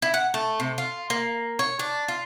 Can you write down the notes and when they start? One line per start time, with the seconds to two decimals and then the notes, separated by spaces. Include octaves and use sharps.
0.02 E4
0.14 F#5
0.34 A3
0.60 C3
0.78 F4
1.10 A#3
1.59 C#5
1.79 D4
2.08 F4